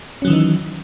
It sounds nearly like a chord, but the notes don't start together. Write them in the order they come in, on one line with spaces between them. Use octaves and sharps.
C#4 F#3 D#3 E3 D#4